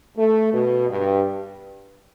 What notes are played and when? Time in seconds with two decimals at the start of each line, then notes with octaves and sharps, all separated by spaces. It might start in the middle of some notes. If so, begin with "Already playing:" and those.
0.16 A3
0.52 B2
0.88 G2